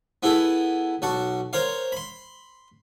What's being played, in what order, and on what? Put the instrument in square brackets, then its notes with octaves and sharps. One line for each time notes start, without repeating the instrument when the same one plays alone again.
[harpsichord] B3 E4 G#4 A4
B1 F#4 A5 C#6
A#4 C5 C#5 F5
B5 C6